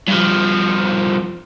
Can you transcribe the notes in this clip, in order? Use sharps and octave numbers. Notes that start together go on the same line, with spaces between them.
G2 F3